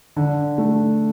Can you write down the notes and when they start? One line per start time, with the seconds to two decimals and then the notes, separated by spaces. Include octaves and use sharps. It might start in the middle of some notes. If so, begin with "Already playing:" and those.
0.16 D3
0.58 A3